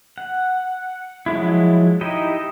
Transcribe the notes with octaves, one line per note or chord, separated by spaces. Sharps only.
F#5
F3 F#3 G#3 E4
D#4 E4 G4 D#5